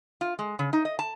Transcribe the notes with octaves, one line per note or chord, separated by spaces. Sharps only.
F4
G#3
C#3
D#4
D#5
A5